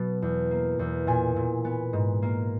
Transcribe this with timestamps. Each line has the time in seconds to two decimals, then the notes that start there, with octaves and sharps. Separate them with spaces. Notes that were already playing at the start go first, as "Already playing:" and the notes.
Already playing: B2 F#3 B3
0.22 E2
0.51 A#3
0.79 E2
1.07 A#2 G#5
1.36 A#2
1.65 B3
1.93 G#2
2.22 A#3